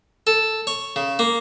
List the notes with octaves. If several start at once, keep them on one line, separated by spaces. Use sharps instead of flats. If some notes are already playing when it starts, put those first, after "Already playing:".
A4
C#5
C#3
A#3